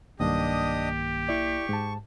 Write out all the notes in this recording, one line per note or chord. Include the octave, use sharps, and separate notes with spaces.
B1 G2 D#3 A#3 D4 G4 D#5 D#6
E4 D5 C#6
G#2 A5